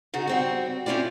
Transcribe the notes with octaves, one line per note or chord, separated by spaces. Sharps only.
C#3 D#4 F#4
G3 C4 F#4
C4 C#4 E4 F4 D5